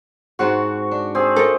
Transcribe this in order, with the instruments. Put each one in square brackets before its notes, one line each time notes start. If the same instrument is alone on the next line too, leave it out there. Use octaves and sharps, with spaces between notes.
[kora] G#2 C4 F#5 [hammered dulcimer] F#4
[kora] D4
[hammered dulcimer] C4 G#4
[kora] A3 [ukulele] A4 A#4